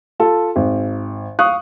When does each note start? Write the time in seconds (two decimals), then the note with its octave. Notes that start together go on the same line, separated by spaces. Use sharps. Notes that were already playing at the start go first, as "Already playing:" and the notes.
0.20 F4 A4
0.56 G#1
1.39 F5 C#6 D#6 F#6